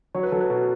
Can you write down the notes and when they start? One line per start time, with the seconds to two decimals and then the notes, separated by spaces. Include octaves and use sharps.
0.15 F#3 C#5
0.23 B4
0.32 F#3 A4
0.40 B4
0.50 B2